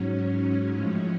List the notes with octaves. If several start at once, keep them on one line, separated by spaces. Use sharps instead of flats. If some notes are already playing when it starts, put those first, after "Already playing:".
Already playing: G#2 F#3 C#4
A2 F3 G#3